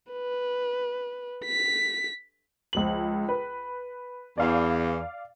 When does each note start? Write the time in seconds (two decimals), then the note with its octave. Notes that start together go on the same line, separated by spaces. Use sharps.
0.13 B4
1.45 B6
2.73 C#2 F3 F#7
3.29 B4
4.38 E2 D5 F5